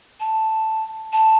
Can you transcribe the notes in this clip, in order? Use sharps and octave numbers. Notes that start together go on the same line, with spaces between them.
A5
A5